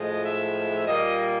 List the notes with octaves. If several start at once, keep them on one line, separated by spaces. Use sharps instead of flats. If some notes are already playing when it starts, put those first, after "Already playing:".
Already playing: A2 F3 G#3 D#5
E5
A#2 G3 A#3 D#5